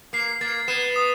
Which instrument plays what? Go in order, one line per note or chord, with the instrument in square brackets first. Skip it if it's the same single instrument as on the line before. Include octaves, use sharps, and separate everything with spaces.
[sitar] A#3 [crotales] C7
[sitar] A#3 [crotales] A6
[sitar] B3 [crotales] E7
[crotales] D#6